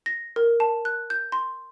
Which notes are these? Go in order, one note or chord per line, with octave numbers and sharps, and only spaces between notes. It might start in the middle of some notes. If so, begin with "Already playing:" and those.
A#6
A#4
A5
F#6
G6
C6